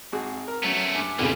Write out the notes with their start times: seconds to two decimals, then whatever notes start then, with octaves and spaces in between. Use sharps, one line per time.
0.12 G#1 F#4 G#4
0.48 A#4
0.63 F#3 A3 B3 C#4
0.95 G2 G#5
1.19 F1 B1 C#3 E3 G3 F4 G#4